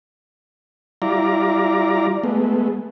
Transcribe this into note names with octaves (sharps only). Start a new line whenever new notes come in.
G3 E4 F4 D5 A#5
G#3 A3 B3